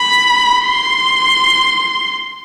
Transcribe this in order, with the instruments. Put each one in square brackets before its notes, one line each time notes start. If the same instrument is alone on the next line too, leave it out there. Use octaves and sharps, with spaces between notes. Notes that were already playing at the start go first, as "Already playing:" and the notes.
Already playing: [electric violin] B5
C6